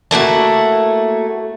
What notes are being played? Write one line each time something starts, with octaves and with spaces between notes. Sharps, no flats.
A3 A#3 E4 F#4